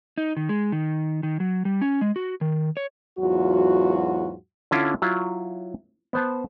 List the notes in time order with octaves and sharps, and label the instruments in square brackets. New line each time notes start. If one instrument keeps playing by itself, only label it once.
[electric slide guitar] D#4
D#3
G#3
D#3
D#3
F#3
G3
C#4
G#3
F#4
D#3
C#5
[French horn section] E2 G#2 F#3 F4 F#4
[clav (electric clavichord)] D3 C#4 E4 F4
F#3 E4 F4
B3 C5 A5